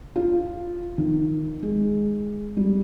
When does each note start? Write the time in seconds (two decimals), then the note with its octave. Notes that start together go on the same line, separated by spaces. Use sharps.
0.16 F4
0.98 D#3
1.62 G#3
2.57 G3